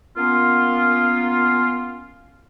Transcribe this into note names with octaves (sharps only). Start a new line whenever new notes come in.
A#3 B3 C#4 F4